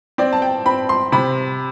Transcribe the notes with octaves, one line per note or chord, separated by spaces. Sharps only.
C4 D5
A5
G5
C4 B5
C6
C3 B5